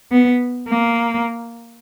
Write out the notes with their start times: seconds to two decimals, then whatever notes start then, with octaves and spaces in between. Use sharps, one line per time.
0.12 B3
0.68 A#3